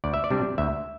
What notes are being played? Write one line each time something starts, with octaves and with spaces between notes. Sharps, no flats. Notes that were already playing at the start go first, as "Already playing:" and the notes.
D2 D5
E5
D5
C3 G3 D4
D2 E5